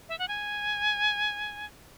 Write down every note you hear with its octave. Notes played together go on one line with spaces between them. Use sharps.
E5
F#5
G#5